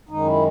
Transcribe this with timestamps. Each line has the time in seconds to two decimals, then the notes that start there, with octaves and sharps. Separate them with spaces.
0.09 F#2 D#3 G#3 D#4
0.26 E4